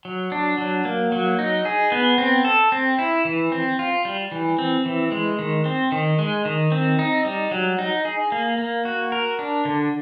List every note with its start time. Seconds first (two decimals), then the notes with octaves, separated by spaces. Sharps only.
0.05 F#3
0.32 D4
0.58 F#3
0.85 A#3
1.12 F#3
1.39 D#4
1.65 G#4
1.92 B3
2.18 C4
2.45 A4
2.72 C4
2.99 E4
3.25 E3
3.52 C4
3.79 F4
4.05 G3
4.32 E3
4.59 C4
4.86 E3
5.12 G#3
5.39 D#3
5.65 C4
5.92 D#3
6.19 G#3
6.45 D#3
6.72 C4
6.99 D#4
7.25 G3
7.51 F#3
7.79 D#4
8.05 G#4
8.32 A#3
8.58 A#3
8.85 F#4
9.12 A#4
9.39 D4
9.65 D3